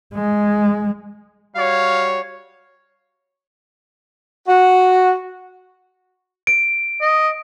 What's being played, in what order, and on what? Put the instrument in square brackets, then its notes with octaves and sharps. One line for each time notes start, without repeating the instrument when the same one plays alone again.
[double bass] G#3
[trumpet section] G3 F#4 C#5 [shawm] F5
[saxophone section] F#4
[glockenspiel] D7
[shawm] D#5